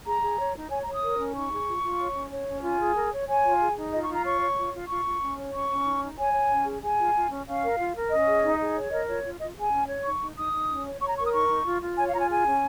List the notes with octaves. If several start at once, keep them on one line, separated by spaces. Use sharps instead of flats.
G#4 A#5
G#4
C#5
D#4
C#5 G#5
A#5
C#5
D#6
A#4
C#4
D#4 C#6
G#4
F4
F4
C#5
C#4
C#5
C#4
F4 G#5
G#4
A#4
C#5
C#5 G#5
F4
G#4
D#4
F4 D#5
C#6
F4
A#5
C#5 C#6
C#5
F4
F4
F4 C#6
F4
C#4
C#5
C#4 C#6
C#4
D#4
D#4
C#5 G#5
C#5
C#4
G#4
G#4 G#5
F4
F4
C#4
C#4 F5
A#4
F4
A#4
C#4 D#5
G#4
D#4
G#4
C#5
A#4 D#5
F4 C#5
F4
F4 D#5
G#4 G#5
C#4
C#5
D#4 C#6
D#4
D#4 D#6
D#4
C#4
C#5
C#5 C#6
A#5
A#4 C#6
D#6
D#4 C#6
D#4
F4
F4
C#5 G#5
F5
F4 A#5
G#5
G#4 G#5
C#4